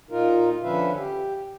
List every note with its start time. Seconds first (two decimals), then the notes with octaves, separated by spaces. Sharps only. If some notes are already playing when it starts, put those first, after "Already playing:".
0.10 A#2 D#4 F4 A#4
0.63 D3 F3 C#4 B4 E5 F5
0.97 G4